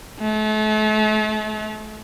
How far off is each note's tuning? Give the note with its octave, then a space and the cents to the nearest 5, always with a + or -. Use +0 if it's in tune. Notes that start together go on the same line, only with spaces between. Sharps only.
A3 -40